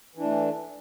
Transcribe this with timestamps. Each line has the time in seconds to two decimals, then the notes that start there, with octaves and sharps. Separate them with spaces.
0.15 E3
0.19 D4
0.24 A3